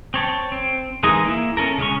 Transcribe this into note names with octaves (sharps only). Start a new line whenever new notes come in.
C4 C#5 A5
C4
E3 G#3 D#4 G#4 A#4
A#3 E4
C#4 A4 A#4
C#3 G#3 C#4 C#6